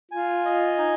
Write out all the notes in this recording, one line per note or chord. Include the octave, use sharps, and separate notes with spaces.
F4 G#5
D#5
D#4